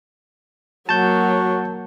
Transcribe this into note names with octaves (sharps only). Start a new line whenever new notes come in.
F#3 A#3 F#4 A5 G6